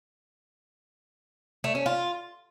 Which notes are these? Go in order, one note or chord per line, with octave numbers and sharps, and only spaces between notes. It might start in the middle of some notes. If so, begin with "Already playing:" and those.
A3
C#4
F4